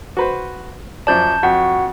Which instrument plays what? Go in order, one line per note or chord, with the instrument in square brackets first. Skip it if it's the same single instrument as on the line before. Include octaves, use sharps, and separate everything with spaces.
[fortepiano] F#4 B4 C5
[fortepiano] F#2 F3 D5 [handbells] A5 G6
[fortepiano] F2 [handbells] F#4 F#5